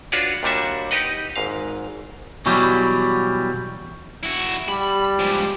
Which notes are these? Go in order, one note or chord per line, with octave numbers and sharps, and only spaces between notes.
D4 F4 F#4 B4 C#5 D5
D#2 A#2 G3 D4 F#4 E5
D#4 G4 B4 D#5 F#5
G#1 G#2 F5
B2 E3 F#3 G3
E4 F#4
G3 B5
F3 G#3